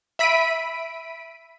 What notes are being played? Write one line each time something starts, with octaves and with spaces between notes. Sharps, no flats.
E5 B5 B6 D7 D#7